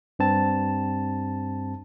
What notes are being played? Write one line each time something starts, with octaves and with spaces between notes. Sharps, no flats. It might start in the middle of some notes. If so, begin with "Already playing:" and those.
G2 C4 A5